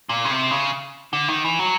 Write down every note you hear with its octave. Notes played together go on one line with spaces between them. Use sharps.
A#2
C#3
C3
C#3
D3
D#3
E3
F#3